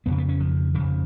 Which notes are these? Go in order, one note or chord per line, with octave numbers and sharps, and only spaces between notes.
F2 C#3 B3
B3
C#4
F3
F2 C#3 F3